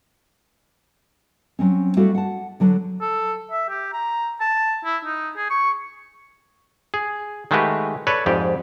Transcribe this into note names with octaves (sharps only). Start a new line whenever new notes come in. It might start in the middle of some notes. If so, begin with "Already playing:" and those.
F#3 C4 C#4
G3 A3 E4 F#4 A4 F5
F#5 A5
D3 F#3 D4
A4
E5
G4
A#5
A5
E4
D#4
G#4
C#6
G#4
D#3 G#3 A3 F#4 G4 B4
A4 B4 C#5 D5
F2 G#2 G4 D5